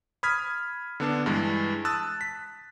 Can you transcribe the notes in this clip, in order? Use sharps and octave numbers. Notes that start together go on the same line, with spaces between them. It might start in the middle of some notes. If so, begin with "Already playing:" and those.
B5 D#6 F6 G#6 B6
D3 B3 D4
G2 E3 G#3
A5 D#6 E6 F#6 A6
B6